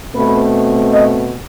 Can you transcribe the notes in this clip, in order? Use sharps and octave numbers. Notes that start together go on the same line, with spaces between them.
B2 A3 C4 B4
D#5